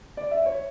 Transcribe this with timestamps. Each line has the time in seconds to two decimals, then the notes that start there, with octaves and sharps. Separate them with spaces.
0.17 D5
0.31 E5
0.46 C#5